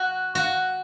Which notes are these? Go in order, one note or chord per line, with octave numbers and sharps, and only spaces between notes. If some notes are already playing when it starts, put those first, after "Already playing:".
Already playing: F#4
F#4